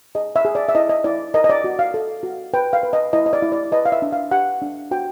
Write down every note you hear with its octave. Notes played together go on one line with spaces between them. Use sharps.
G#4 D#5
E5
G#4
D5
E5
E4 D#5
D#5
E4 D5
A#4 D#5
D#5
D5
F#4
F5
A4
F#4
B4 G5
F5
B4
D#5
E4 D#5
D#5
D5
E4
D5
B4 D#5
F5
E5
D4
F5
G4 F#5
D4
F#4 G5